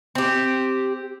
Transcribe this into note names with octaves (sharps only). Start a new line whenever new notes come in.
C4 G4